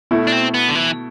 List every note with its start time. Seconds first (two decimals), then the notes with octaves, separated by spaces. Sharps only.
0.11 B2 A3 E4
0.27 D4
0.32 C4
0.54 B3
0.68 D3
0.75 E3